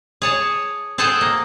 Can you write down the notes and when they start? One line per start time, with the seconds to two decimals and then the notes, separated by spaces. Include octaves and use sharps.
0.22 G#4 C#5 A5
0.98 G#4 A4 C5 F#5 G5 A5
1.21 A#3